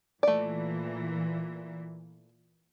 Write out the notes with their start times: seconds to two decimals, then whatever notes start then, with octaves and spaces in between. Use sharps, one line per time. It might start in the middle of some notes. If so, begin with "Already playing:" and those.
0.23 A#2 E3 A3 D5